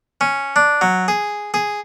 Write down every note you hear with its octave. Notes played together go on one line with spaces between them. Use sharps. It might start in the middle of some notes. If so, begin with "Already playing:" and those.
C#4
D4
F#3
G#4
G#4